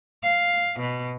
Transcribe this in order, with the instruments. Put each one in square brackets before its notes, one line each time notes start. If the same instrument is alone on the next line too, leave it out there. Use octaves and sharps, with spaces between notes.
[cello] F5
B2